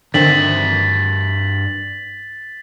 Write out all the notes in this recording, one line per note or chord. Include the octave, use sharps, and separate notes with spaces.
G2 D3 D#3 C4 E5 A6 B6 F#7